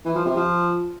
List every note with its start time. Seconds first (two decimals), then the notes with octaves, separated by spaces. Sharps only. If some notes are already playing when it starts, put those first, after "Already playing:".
0.05 E3
0.15 F3
0.26 C3
0.36 F3